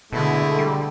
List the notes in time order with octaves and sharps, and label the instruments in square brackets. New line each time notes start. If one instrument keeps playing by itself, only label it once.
[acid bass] B2 [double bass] D3 [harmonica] G#3 A3 E4
[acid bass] G3